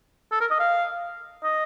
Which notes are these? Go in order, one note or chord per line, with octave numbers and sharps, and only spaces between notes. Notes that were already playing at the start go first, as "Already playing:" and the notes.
A4
A#4
D#5
F5
D#5